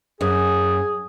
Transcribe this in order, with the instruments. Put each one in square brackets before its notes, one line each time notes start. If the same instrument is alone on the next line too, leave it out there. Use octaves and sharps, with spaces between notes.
[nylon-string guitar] F#2 [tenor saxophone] G#4